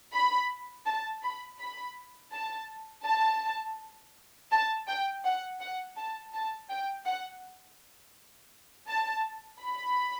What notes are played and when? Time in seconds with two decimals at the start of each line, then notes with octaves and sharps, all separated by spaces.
0.13 B5
0.86 A5
1.23 B5
1.59 B5
2.33 A5
3.05 A5
4.51 A5
4.87 G5
5.24 F#5
5.60 F#5
5.96 A5
6.34 A5
6.69 G5
7.05 F#5
8.88 A5
9.61 B5